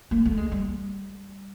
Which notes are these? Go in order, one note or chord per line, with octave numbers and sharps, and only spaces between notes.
A#3
A3
G#3
G3